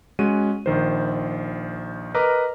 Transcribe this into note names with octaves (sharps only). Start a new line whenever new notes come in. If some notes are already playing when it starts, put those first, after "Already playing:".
G#3 C#4 F#4 D#7
A#1 D#3 C5
A#4 B4 D#5 A#5 D6 F6